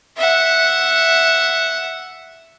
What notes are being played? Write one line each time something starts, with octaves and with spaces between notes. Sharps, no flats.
E5 F#5